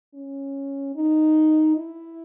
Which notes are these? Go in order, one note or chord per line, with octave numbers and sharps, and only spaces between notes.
C#4
D#4
E4